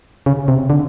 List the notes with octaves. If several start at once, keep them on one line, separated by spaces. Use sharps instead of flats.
C#3
C3
D3